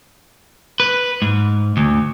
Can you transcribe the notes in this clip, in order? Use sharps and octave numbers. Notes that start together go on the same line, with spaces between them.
B4
G#2
D2